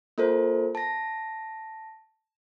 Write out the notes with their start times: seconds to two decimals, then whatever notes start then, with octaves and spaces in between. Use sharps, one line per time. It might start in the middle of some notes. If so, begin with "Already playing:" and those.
0.18 A#3 F4 A4 A#4 C5
0.75 A5 A#6